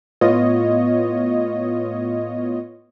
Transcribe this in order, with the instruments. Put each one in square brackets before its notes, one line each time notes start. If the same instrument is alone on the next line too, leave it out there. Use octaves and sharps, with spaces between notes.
[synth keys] A2 B3 F4 C#5 D#5